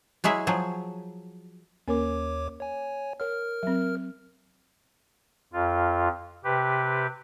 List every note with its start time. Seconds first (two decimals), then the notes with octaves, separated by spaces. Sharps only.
0.24 F#3 G#3 E4 G#4 E5
0.47 F3 F#3 G#4
1.88 D#2 A#3 C#4 A#4 C#5 D6
2.60 C#5 G#5
3.20 A#4 C#5 F6
3.63 F#3 C4
5.53 F2 F4
6.44 C3 G4 B4